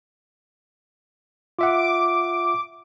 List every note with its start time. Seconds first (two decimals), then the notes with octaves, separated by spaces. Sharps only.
1.59 F4 E5 F#5 D6